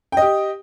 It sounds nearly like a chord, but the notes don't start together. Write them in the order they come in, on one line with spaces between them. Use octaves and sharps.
G5 D#5 G4